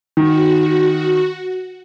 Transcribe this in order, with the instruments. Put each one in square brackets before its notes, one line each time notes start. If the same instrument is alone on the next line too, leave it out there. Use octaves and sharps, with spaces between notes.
[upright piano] D#3 [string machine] F#4